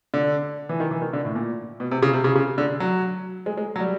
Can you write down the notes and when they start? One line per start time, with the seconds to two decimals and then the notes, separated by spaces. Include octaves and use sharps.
0.14 D3
0.69 E3
0.80 D#3
0.91 E3
1.02 D#3
1.13 D3
1.25 A2
1.35 A#2
1.80 B2
1.91 C3
2.03 C#3
2.13 C3
2.24 C#3
2.36 C#3
2.58 D3
2.80 F#3
3.46 G#3
3.57 G#3
3.76 F#3
3.80 G3